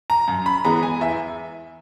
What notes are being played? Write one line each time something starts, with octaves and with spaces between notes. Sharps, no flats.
A#5
F#2
B5
E3 G#3 B3 A#5
G#5
E2 E5